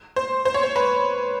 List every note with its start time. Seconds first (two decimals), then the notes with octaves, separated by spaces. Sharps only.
0.16 C5
0.45 C5
0.54 C#5
0.63 C5
0.76 B4